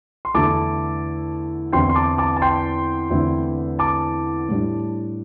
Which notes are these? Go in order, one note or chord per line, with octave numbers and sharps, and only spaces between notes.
C6
E2 D3 A3 E4 A5 D6
E2 D3 C4 E4 G5 C6
C6
A5 D6
A5 D6
A5
G5 C6
E2 D3 A3 C4 E4
A5 D6
A2 G3 D4